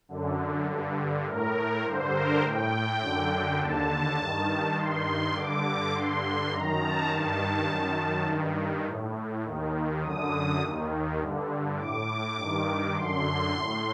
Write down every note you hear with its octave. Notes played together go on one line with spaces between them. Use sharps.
F#2 D3
G2 D3
A2 A#4
A#4
G2 D3 C5
A#4
A2 G5
F#2 D3
D#2 D3 A5
G2 D#3
G2 D#3 C6
G2 D3 D6
G2 D3 C6
F#2 D#3 A#5
A5
G2 D#3 A5
F#2 D#3
G2 D#3
A2
D#2 D#3
F#2 D3 D#6
D#2 D#3
G2 D3
A2 D6
G2 D#3
F#2 D3 C6
A2